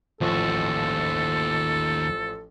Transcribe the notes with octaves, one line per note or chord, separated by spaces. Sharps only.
A1 D#2 F3 F#4 A4